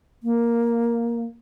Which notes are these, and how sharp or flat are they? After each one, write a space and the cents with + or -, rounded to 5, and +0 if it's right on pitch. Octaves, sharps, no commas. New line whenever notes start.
A#3 +5